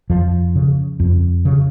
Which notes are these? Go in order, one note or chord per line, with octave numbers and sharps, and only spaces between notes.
F2 F3
C#3
F2
C#3